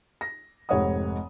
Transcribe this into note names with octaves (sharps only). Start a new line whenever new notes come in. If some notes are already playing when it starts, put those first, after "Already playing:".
A#6
F1 G#2 C#5 D#5 F#5 D#6